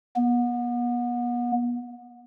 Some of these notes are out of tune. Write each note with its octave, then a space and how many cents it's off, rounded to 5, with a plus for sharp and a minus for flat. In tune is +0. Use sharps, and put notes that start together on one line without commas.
B3 -35